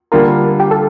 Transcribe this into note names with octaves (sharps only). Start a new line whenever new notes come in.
D3 G3 A#3 D4 F4 A#4
G4
A4